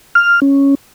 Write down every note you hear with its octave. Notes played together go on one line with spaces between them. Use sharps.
F6
C#4